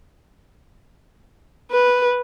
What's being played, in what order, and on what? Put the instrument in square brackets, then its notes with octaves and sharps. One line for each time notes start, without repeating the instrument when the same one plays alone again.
[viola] B4